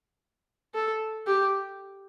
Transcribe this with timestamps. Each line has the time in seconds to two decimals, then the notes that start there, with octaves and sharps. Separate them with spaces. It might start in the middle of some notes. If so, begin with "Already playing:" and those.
0.74 A4
1.27 G4